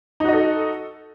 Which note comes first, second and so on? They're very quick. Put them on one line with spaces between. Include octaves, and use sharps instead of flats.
D#4 F#4 D#5 A4